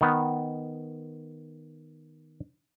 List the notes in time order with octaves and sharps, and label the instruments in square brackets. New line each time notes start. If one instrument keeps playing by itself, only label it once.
[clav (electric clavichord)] D#3 B3